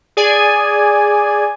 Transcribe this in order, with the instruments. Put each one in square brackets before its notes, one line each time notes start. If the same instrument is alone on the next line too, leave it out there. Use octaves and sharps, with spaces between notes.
[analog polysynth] G#4 D5 G#5